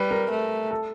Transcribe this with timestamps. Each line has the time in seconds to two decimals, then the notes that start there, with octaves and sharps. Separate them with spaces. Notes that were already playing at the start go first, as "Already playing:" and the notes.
Already playing: G3 B4
0.11 A#4
0.30 A3
0.71 A4